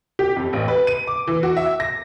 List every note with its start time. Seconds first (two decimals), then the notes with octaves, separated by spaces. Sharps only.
0.19 G4
0.36 F2
0.53 A1
0.68 B4
0.87 D#7
1.07 D6
1.27 E3
1.43 F#4
1.57 E5
1.80 A#6